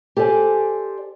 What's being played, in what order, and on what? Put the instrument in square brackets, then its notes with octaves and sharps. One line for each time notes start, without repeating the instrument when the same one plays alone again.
[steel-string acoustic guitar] G4 A4 C5 D5 G#5